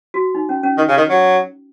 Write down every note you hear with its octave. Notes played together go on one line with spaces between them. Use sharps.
F#4
D#4
C#4
C#4
D#3
C#3
D#3
F#3